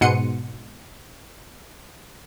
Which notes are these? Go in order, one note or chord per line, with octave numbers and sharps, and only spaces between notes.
G#2 B2 F#5 C6 C#7 D#7